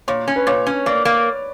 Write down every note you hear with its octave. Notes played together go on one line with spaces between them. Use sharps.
A#2 C#5
C#4
B4
A#2 C#5
C#4
A#3 D5
A#3